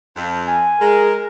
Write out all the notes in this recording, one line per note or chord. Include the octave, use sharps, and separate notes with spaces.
F2
G#5
G#3 G#4 A#4